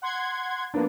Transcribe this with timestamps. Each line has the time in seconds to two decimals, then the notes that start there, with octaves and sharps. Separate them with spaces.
0.02 F#5 C6 G#6
0.74 F3 A#3 B3 D4